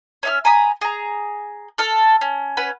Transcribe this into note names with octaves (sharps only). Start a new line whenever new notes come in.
C#4 E5 F6
G#5 A#5 B5 D#6
G#4 A#5
A4 F6
C#4
C#4 B4 F#5